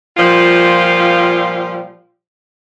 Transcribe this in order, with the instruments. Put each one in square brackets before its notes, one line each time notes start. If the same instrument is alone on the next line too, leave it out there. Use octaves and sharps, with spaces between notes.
[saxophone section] A#2 F3 G3 F4